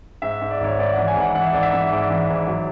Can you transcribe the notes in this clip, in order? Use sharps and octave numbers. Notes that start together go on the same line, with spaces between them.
G#2 E5
G#2
D5
G#1 C#5
G#2 D5
E3 F#5
G#5
G#1 F#5
E3 F#5
E5
G#1 D5
E5
E3
G#2 D5
E3
G#1
F#3